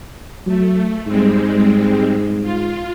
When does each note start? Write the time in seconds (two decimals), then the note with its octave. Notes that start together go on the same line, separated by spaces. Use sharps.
0.47 F#3 A3
1.06 G#2 G3 G#3 C4
2.42 F4